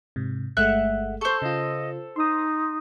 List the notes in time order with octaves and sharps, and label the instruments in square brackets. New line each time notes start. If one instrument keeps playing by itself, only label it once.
[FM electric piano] G#2 C3
[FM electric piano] G1 G#3 A3 [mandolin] E5 F#5 F#6
[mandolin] A4 C5 [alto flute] C#6
[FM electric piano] C#3 F4 [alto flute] D#5
[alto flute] D#4 [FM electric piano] C6 D#6